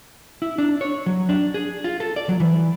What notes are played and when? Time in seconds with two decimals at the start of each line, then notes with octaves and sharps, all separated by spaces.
0.42 E4
0.58 D4
0.81 C#5
1.06 F#3
1.29 D4
1.54 G#4
1.84 F4
2.00 A4
2.16 D5
2.29 F#3
2.40 E3